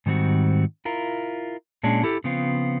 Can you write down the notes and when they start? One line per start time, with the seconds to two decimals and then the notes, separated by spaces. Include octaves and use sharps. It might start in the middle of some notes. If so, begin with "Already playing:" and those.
0.06 G#2 D#3 G3 C4 F#4
0.85 E4 F4 A#4
1.83 A#2 G#3 C#4 D4
2.03 E4 G4 A4
2.24 C#3 F3 B3 C4 F4